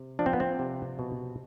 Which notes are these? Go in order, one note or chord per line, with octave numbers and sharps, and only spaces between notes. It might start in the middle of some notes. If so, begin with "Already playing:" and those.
Already playing: C3
F3 D4
C4
B3
C4
C3
B2